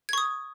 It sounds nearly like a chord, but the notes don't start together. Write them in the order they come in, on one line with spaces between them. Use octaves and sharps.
G#6 C#6 D#6